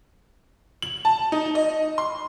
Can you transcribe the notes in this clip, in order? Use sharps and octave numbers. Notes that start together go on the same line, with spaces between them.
F#7
A5
D#4
D#5
C6